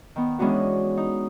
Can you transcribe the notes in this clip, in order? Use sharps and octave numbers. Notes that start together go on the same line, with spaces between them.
D#3 B3
E3 G#3 B3 C#4 D4 F#4
D#4